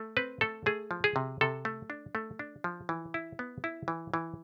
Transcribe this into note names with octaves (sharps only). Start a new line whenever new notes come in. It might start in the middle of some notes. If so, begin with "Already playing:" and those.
Already playing: A3
C4 B4
A3 A4
A3 G#4
F3
G#4
C3
C3 A4
A3
D4
A3
D4
F3
E3
E4
B3
E4
E3
E3